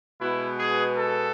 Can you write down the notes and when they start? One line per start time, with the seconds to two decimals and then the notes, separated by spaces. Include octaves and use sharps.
0.19 B2 G#3 B3 E4
0.57 G#4
0.95 A4